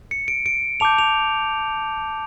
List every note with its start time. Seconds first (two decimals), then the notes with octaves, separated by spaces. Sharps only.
0.11 C#7
0.28 D7
0.46 D7
0.80 A5 D6 G6 F7
0.98 F7